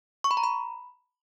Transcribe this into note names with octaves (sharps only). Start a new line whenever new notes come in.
C#6
B5
A#5
B5